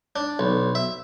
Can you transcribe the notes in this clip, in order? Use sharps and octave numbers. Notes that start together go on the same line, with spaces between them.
D4
B1
E5